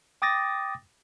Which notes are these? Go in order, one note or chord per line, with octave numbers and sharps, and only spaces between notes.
G5 D6 D#6 A6 A#6